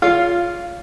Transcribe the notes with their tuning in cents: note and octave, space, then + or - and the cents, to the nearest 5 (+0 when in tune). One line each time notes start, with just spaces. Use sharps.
F4 +0 C#5 +35 F5 -10